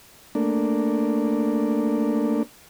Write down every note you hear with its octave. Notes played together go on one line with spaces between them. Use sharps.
A3 A#3 D4